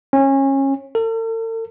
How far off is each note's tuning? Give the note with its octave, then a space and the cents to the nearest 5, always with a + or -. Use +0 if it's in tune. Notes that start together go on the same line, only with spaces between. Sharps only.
C#4 -25
A4 +45